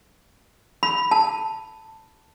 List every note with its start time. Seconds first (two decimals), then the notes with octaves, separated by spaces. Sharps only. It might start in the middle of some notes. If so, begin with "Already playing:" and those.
0.83 B5
1.11 A5